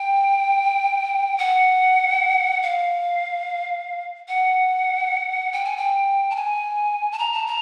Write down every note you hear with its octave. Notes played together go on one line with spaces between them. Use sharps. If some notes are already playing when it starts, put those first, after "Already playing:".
Already playing: G5
F#5
F5
F#5
G5
G#5
G5
A5
G#5
A5
A#5
A5
A#5